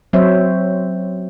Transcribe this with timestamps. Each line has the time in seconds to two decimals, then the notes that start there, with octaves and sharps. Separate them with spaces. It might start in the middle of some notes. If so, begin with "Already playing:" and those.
0.13 F#3 C4 C5 C#5 E5